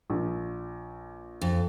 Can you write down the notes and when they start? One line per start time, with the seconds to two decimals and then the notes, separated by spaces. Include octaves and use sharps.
0.10 A#1
1.41 F2